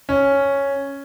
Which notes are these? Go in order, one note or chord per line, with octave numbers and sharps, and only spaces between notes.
C#4